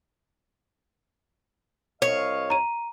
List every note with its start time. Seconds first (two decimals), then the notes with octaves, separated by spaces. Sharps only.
2.02 C2 C#5 D#5 F5
2.50 A#5 D#7